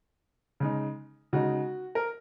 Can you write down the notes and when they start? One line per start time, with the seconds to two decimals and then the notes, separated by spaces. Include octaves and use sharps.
0.60 C#3 G#3 D#4
1.33 C#3 G#3 D#4 F#4
1.95 A#4